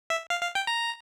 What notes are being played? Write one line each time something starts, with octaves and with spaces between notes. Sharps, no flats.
E5
F5
F5
G5
A#5